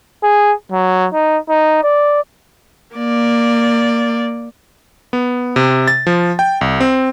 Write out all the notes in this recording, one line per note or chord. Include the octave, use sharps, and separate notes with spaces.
G#4
F#3
D#4
D#4
D5
A#3 D5
B3
C3
A6
F3
G5
C2
C4